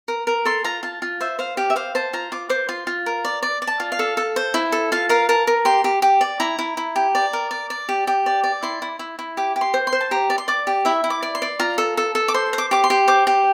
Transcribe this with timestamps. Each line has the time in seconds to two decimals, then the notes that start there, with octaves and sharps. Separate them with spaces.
0.08 A#4
0.27 A#4
0.45 A4 C6
0.64 F4 A#5
0.83 F4 A5
1.02 F4
1.21 C5 E5
1.39 C5 F5
1.57 G4 F5
1.70 E5
1.76 C5 F5
1.95 C5 A5
2.13 F4 A#5
2.32 F4 D6
2.49 C5 D6
2.69 F4 C6
2.87 F4
3.06 A#4
3.25 D5
3.43 D5
3.62 D5
3.67 A5
3.80 F4
3.92 F5
3.99 A4
4.17 A4
4.36 C5
4.54 E4
4.72 A4
4.92 F4 F5
5.09 A#4 F5
5.29 A#4 A5
5.47 A#4
5.65 G4 C6
5.84 G4
6.02 G4
6.21 D5
6.40 E4 A#5
6.59 E4
6.77 E4
6.96 G4
7.15 D5
7.33 A#4
7.51 D5
7.70 D5
7.89 G4
8.07 G4
8.26 D5
8.44 D5
8.63 E4 C6
8.82 E4
8.99 E4
9.19 E4
9.37 G4 D6
9.56 G4
9.61 C6
9.74 C5
9.87 C6
9.93 C5
10.01 A5
10.11 G4 A#5
10.30 D5
10.38 C6
10.48 D5 D6
10.67 G4
10.85 E4 E5
11.04 E4
11.10 D6
11.23 D5
11.35 C6
11.42 D5
11.59 F4 A#5
11.78 A4
11.97 A4
12.15 A4
12.28 D6
12.34 C5 C6
12.53 C5
12.58 D6
12.71 G4 D6
12.84 C6
12.90 G4
13.08 C5 D6
13.27 G4